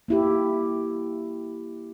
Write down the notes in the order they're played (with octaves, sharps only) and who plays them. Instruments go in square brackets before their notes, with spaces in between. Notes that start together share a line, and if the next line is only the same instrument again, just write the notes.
[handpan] A#3 E4 G4